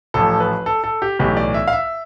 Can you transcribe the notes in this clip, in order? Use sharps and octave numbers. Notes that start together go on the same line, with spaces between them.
A1 A2 F3 A4
B4
A4
A4
G4
B1 A2 E3 G4
D5
E5
F5
E5